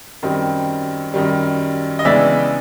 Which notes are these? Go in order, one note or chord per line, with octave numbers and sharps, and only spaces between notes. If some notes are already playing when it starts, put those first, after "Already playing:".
F#2 D#3 G3 C4
F#2 D#3 G3
D#5
C#3 E3 G#3 B3 D4 D5 E5